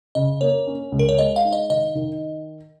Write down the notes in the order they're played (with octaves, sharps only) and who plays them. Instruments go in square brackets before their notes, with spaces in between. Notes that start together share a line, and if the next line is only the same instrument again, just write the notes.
[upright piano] C#3 [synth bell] D#5
[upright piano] A#3 [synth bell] C#5
[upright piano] C#4
C#2
[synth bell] A#4
C#5
[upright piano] G#3 [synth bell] D#5
[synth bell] F5
[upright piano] D#4
[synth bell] D#5
[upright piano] D#3 [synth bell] D#5
[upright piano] D#3